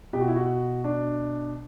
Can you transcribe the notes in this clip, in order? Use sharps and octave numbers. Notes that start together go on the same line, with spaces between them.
B2 G4
F#4
E4
F#4
D4